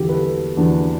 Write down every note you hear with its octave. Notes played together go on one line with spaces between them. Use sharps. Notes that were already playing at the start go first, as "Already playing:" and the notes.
Already playing: E2 D3 F#3 F#4 G4 A4
B4
A4
E2 D3 F#3 D4